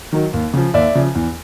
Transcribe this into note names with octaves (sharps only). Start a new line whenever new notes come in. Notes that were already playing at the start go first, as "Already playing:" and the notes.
D#3 F#3
D#2
C#3 F3
D#2 D5 E5
C#3 F3
E2